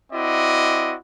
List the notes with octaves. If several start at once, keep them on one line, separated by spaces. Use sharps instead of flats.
C4 E4 F#4 D5 D#5